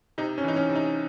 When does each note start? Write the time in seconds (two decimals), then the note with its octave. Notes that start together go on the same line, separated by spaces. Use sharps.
0.18 C3 D#4
0.38 C#4
0.43 E3 D#4
0.56 C#4
0.69 C3
0.76 D#4